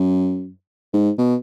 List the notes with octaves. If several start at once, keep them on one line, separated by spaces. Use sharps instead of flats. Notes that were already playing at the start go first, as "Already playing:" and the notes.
Already playing: F#2
G#2
B2